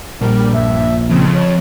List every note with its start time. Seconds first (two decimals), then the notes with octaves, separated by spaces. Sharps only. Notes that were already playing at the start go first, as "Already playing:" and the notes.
0.21 A#1 G3 A#4
0.53 G2 E5
1.11 F2 C#3 C4
1.34 C#5